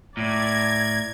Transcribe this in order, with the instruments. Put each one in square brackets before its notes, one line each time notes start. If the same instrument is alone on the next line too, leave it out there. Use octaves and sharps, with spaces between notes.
[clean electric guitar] A2 [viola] D5 [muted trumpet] A#5 [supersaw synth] G#6